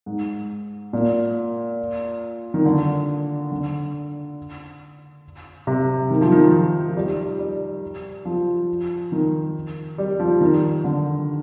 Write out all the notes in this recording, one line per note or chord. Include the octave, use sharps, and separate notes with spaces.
G#2
A#2
D#3
D3
D3
C3
D#3
F3
D#3
F3
F3
G3
G3
F3
D#3
G3
F3
D#3
D3